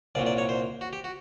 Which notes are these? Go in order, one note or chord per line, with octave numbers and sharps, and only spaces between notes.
C2 A#2 F#3 D5
D5
C#5
C5
F#4
G4
F#4